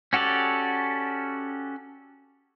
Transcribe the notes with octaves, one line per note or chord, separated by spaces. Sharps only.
C#4 F#4 G4 A4 D5